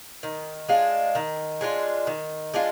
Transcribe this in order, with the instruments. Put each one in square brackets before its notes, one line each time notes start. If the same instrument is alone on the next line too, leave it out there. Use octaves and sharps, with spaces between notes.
[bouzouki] D#3
G#3 D4 F4
D#3
G#3 D4 F4
D#3
G#3 D4 F4